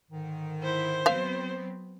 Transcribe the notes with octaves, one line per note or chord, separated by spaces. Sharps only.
G#2 D3 D#3
E4 C5
F#3 B3 C4 E5 F5